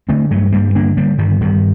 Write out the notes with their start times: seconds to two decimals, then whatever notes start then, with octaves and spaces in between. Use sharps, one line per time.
0.09 D3 A3 C4
0.30 G2 F#3 A3
0.52 G2 G3 A#3
0.75 D3 A#3 D4
0.97 D3 G3 A#3
1.18 G2 D#3 G3
1.41 G2 D#3 G3